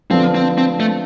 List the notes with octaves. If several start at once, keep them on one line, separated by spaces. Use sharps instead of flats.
D3 F3 B3 C4 D4 A4
C4
C4
A3